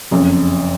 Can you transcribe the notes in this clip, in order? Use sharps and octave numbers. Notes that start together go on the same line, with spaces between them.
F#1 F2 C#3